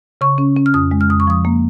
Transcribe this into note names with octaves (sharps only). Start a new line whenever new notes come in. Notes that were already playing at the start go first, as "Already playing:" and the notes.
C#3 C#6
C#4
C#4
F6
F2 D#6
G#3
F6
F2 D#6
C#6
F3 D#6
A#3